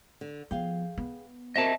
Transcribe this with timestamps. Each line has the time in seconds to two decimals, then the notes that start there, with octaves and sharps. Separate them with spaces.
0.21 D3
0.51 F3 B3 G#4 F5 G5
0.98 B3
1.56 C4 F#4 A#4 D#5 E5 A5